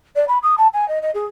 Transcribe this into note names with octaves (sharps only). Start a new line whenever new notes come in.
D5
B5
D#6
A5
G#5
D#5
D#5
G#4